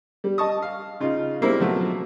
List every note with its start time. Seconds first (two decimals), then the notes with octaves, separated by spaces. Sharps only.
0.24 G3
0.38 D#5 A5 C#6 D#6
0.62 F5
1.00 C#3 D#4 F4
1.41 G3 G#3 A#3 C4 E4
1.59 B2 F3 F#3 A3